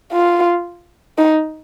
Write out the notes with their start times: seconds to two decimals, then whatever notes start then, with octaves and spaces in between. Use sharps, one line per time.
0.12 F4
1.18 D#4